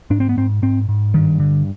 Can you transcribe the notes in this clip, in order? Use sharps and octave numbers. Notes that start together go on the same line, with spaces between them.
G#2 D4
C4
B3
G#2 C4
G#2 C4
G#2
G2 D#3
D3